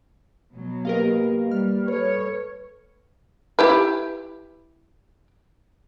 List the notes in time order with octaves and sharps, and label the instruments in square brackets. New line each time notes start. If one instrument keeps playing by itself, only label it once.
[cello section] B2 F#3
[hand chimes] A#3 G4 B4 [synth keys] A#4 D#5 F5
[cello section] G3 [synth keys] F6
[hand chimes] A4 B4 [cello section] C#5
[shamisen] E4 G4 B4